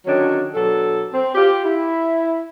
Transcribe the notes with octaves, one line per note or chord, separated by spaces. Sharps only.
D3 D#3 F#3 C#4 D4
B2 F#3 D4 A4
C4
F4 G4
E4